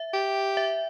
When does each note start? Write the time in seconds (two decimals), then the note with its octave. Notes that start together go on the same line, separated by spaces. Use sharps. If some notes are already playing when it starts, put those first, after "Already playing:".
Already playing: E5
0.14 G4
0.57 E5